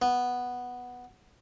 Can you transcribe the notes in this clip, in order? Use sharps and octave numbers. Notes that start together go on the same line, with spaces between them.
B3